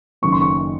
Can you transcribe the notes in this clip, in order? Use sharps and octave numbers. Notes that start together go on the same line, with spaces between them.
F#1 F#2 D#3 F#3 A#3 C#6
C6
C#6